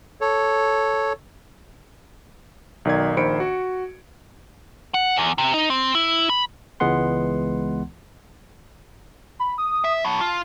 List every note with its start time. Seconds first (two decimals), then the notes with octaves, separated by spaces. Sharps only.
0.21 A4 C#5
2.85 B1 D#3 D5 G#6
3.17 A#1 D#3 C5 B5 C#7 D7
3.40 F#4
4.94 F#5
5.16 E2
5.38 C3
5.54 D#4
5.70 C4
5.95 E4
6.29 B5
6.80 C#2 E3 G#3 B3 F#5 C6
9.40 B5
9.58 D#6
9.84 E5
10.05 F#3 B3 A5
10.21 F4